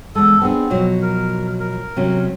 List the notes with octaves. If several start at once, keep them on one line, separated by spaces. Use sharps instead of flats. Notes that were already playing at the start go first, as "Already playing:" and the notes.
E2 G#3 A4
B3 C4 D4 G#4
B2 F3 F#3
A#4
A#4
C3 F#3 C#4